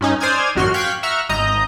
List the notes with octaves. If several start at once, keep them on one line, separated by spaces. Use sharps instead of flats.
G2 C#4 D#4
C5 D5 G#5 D#6 F6 G#6
A1 F#2 F#4 C6 F6
F5 G5 C#6 F#6 G#6 B6
E5 F#5 A#5 C#6 F6
G#1 D#5 A#5 G6